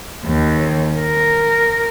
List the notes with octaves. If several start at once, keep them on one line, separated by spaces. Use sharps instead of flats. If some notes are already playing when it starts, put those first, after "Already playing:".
D#2
A#4